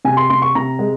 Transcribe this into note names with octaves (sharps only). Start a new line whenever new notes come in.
C3 G#5
C6
C3 C6
C#6
C3 A#5
G#3